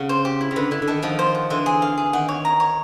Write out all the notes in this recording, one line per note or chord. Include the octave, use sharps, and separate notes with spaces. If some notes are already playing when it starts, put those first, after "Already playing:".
Already playing: C#3 F#5
C5
G4
E4
C#3
D3 B4
D3 E4
D3
D#3 A4
D#3 F3 F#4
C5
F#4
D3 E3 C5
G#4
F5
G#4
D#3 F#5
C#5
A#5
C#5